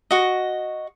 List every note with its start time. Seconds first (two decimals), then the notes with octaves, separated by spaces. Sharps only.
0.11 F#4 D#5